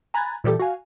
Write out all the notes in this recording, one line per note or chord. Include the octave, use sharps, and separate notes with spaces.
G#5 A#5 B5 F#6 G#6 A6
A#2 E3 G3 G4 A4
F#4 F5 G#5